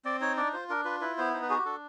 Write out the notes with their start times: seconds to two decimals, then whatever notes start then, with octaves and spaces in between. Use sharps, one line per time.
0.05 C4 D5
0.20 D#4 C#5
0.37 D4 D5
0.53 F4 C5
0.69 D4 A#4
0.85 F4 B4
1.01 E4 B4
1.18 B3 C5
1.34 D#4 C5
1.42 B4
1.50 F#4 G#4
1.58 G4
1.65 D4 A4